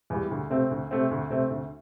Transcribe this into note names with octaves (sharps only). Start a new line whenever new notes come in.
E2 E3 G3
D2
C3 A3 C4
D2
C3 A3 C4
D2
C3 A3 C4
D2